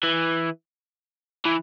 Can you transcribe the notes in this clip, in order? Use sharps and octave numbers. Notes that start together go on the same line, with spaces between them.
E3
E3